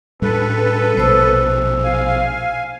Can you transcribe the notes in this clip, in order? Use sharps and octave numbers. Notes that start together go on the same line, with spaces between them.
A2 G3 D4 A4 B4
A#1 B2 C5 E6
F5 G#5